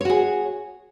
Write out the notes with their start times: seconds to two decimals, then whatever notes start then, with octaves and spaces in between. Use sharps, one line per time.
0.01 C#5
0.05 F#4
0.09 G#4